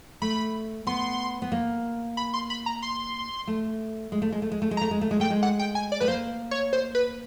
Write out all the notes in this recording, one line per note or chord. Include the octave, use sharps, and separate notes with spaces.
A3 B5
B3 C6
B3
A#3
B5
C6
B5
A#5
C6
A3
G#3
A3
G#3
A3
G#3
A3
G#3
A#5
A3
G#3
A3
G#3
A3 G5
G#3
F#5
G5
G#5
D5
A3 B4
A#3 C5
C#5
C5
B4